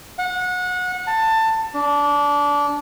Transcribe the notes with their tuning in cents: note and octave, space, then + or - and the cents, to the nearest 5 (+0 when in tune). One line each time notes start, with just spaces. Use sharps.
F#5 -25
A5 +20
D4 -20